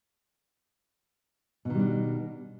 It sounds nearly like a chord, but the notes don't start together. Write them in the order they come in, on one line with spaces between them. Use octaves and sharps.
B2 D#3 G3 D4